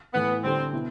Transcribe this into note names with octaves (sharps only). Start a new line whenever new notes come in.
A2 E3 A3 B3
D3 G3 C4 D4 A4
B2 B3 E4